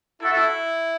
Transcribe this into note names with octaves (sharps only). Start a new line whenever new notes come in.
E4 F#4 A4 E5
E4